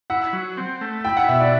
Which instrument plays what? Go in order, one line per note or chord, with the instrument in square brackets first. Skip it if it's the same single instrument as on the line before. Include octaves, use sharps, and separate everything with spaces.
[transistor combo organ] E4 [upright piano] F#5
[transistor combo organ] F#3
C4
A3
[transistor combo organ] E4 [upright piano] G5
[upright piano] F#5
[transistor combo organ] B2 [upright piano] E5
[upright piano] D5